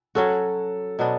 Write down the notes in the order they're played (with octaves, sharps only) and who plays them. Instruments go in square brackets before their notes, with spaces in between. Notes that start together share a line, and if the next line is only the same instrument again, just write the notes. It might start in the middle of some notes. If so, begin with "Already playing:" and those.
[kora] F#3 C#4 F#4 [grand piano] A4
[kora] B2 F#3 B3 D4